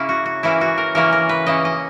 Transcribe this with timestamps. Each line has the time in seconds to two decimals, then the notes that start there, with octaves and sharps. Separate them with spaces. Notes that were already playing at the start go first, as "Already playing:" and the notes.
Already playing: C#3 A#3 C#4 E4
0.09 F#4
0.26 F#4
0.43 C#3 E3 A#3 C#4 E4
0.61 F#4
0.78 A#4
0.95 C#3 E3 A#3 C#4 A#4
1.12 A#4
1.29 B4
1.46 C#3 E3 A#3 C#4 D#5
1.65 D#5